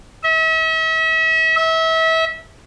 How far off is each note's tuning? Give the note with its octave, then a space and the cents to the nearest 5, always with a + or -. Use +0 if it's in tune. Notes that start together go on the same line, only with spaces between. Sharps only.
E5 -40
E5 -30